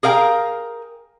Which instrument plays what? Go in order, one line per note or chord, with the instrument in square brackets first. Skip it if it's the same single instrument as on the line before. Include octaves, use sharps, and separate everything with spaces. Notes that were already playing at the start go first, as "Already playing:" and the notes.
[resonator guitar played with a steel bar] G#4 A#4 F5 G5 A#5